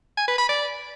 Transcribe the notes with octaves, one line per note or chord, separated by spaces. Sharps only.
G#5
B4
B5
D5